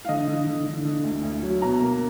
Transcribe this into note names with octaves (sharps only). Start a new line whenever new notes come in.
F5
D3 D#5
D3
D3
D3
D3
D2
D2
F#3
B2 A#5
A#3